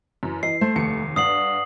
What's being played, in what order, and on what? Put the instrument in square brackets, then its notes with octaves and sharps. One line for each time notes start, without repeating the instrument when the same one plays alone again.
[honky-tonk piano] F#2 E3
[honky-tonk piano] E3 [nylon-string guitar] D#5 [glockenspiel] C7
[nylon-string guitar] A3 [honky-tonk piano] C5
[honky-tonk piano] F1 D#2 C#7
[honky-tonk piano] G2 [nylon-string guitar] D5 F#5 [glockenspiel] D#6 C7 F#7